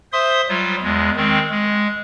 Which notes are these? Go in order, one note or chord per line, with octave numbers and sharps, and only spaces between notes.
C5 E5 C6 D#6
F#3 G3 F4
E2 G#3
D#3 G#3 C4
G#3